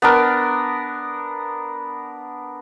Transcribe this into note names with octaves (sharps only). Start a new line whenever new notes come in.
B3 D4 A#4